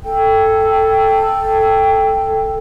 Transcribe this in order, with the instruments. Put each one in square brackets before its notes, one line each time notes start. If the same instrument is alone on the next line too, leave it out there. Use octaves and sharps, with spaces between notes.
[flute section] A4 G5